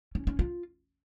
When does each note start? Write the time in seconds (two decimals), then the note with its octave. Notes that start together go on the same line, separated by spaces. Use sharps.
0.15 C#4
0.27 C#4
0.39 F4